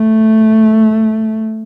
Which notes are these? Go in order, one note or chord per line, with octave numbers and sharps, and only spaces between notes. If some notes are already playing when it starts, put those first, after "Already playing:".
Already playing: A3